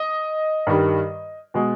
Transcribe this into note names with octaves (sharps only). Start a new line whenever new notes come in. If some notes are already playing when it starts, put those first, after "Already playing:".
Already playing: D#5
G2 D#3 G3
B2 G#3